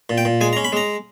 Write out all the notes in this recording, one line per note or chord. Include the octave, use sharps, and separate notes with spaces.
A#2
G5
A#2
G#3 G#5
A#5
C#4
B5
G#3 A#5